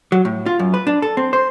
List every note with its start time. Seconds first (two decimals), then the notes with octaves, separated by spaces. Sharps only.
0.12 F#3
0.25 A2
0.46 F4
0.59 F#2
0.74 B4
0.87 D4
1.02 A4
1.17 C4
1.33 C5